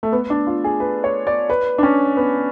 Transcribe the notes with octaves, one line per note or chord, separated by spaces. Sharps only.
A3
B3
D4
F4
G#4
B4
C#5
D5
B4
D4
C#4
B3